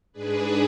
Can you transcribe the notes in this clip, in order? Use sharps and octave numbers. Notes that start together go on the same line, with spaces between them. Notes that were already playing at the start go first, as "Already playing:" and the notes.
G#2 G#3 D4 G#4 B4